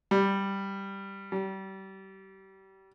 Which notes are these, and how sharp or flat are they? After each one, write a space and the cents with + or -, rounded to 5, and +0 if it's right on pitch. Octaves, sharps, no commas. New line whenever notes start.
G3 +0
G3 -30